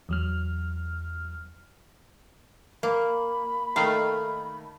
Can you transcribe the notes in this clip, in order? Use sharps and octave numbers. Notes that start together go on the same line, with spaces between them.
E2 F#3 F6
A#3 B5
D#3 A3 F5